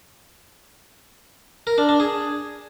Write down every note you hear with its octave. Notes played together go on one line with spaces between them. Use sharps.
A#4
D4
D4
G#4